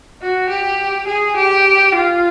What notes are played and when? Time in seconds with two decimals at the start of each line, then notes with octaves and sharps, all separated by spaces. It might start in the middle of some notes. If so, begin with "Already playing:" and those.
0.22 F#4
0.50 G4
1.07 G#4
1.36 G4
1.95 F4